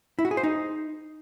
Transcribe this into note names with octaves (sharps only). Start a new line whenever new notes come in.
E4
F#4
G#4
C5
D#4